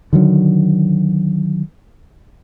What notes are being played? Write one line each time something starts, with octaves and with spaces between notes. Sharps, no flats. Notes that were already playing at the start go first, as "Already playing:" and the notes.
D3 D#3 F#3